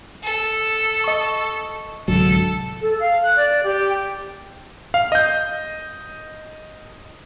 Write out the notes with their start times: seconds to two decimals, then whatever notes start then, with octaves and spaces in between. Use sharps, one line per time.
0.23 A4
1.04 D#5 C#6
2.08 C2 G#2 D3 F#3 A4
2.81 A4
3.00 F5
3.23 F#6
3.38 D5
3.63 G4
4.94 F5
5.12 D#5 G6